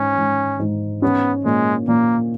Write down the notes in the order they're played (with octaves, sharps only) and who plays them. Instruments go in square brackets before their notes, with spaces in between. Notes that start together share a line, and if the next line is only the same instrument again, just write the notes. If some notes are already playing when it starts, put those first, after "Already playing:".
Already playing: [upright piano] G#2 [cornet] C#4
[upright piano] G#2
G#2
[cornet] B3 [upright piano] C#4
[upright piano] A#2 [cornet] G#3
[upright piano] A#2 [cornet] A#3